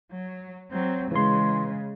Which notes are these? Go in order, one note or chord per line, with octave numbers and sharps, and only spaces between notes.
F#3
F#3 C4
C#3 E3 G#3 C6